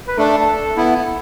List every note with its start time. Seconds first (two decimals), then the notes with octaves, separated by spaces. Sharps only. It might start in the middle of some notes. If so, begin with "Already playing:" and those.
0.08 B4
0.18 A3 D4 A4
0.77 B3 E4